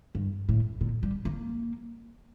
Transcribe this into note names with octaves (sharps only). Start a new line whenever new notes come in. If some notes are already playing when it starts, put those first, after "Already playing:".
G2
A2
A#2
G3
A#3